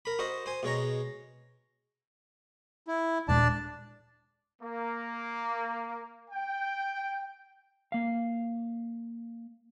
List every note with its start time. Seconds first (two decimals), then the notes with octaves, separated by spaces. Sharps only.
0.05 A#4 B5
0.19 F#4 C5 D#5
0.46 C5 G#5 C6
0.63 B2 G#3 C#5 A#5
2.87 E4
3.28 D#1 A#2 G#3 D4 D5 A5
4.61 A#3
6.31 G5
7.92 A#3 F5